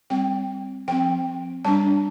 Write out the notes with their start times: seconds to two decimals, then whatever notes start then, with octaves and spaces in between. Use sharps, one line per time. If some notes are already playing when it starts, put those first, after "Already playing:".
0.10 G3 C4 G5
0.88 F3 C4 G5
1.65 G3 D4 A5